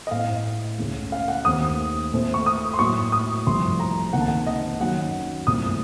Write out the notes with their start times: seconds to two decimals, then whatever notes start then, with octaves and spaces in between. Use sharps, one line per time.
0.07 D#5
0.11 A2 A3 C4 F5
0.79 C#2 C#3 A3
1.12 F5
1.28 F#5
1.45 D#2 D#3 A3 C4 D#6
2.13 A#2 A3 C4
2.34 C#6
2.46 D#6
2.74 C6
2.79 A2 F#3 A#3 C#6
3.12 D#6
3.47 C2 C3 F3 A3 C4 C6
3.80 A#5
4.13 C#2 C3 D#3 A#3 F#5
4.20 A5
4.28 F#5
4.47 D#5
4.81 F#2 D#3 F#3 F#5
5.47 C2 A#2 A3 C4 D#6